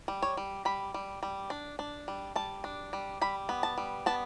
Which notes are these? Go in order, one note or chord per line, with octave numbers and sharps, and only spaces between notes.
G3
C#5
G3
G3 B5
G3
G3
D4
D4
G3
G3 A5
D4
G3
G3 B5
B3
A5
G3
B3 A5